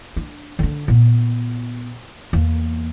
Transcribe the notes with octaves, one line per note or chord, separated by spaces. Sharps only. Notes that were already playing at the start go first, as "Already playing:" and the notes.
D4
D3 D4
A#2 B3
E2 A#3